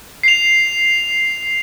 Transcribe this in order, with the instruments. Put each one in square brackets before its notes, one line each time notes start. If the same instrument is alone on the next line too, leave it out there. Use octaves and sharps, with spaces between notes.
[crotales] C7 F7